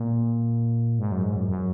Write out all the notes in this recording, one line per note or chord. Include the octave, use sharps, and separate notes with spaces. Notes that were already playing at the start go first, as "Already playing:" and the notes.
Already playing: A#2
G#2
F#2
G#2
F#2
F#2